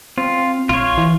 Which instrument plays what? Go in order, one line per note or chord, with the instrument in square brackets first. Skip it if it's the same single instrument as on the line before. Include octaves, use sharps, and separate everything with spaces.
[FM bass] C4 [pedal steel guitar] F4
[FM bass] A#1 [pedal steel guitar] F4 C#5
[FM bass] E3